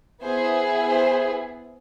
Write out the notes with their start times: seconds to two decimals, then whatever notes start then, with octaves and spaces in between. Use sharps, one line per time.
0.22 B3 E4 G#4 C5
0.88 C5